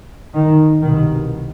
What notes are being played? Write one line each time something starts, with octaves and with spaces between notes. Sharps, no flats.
D#3
C2 B2 D#3